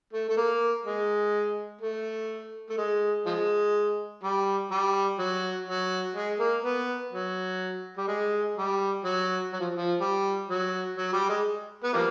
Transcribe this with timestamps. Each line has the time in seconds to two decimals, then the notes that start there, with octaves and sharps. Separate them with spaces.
0.13 A3
0.29 A3
0.37 A#3
0.85 G#3
1.81 A3
2.69 A3
2.78 G#3
3.26 F3 G#3
4.23 G3
4.71 G3
5.19 F#3
5.67 F#3
6.15 G#3
6.39 A#3
6.63 B3
7.12 F#3
7.97 G3
8.08 G#3
8.57 G3
9.04 F#3
9.53 F#3
9.60 F3
9.75 F3
10.00 G3
10.49 F#3
10.97 F#3
11.13 G3
11.29 G#3
11.84 B3
11.93 F3 G3 A#3